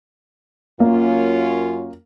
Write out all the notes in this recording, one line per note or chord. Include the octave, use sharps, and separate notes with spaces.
F#2 A#3 C#4 F4